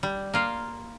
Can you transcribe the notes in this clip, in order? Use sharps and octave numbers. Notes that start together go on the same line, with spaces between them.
G3
A#3 F4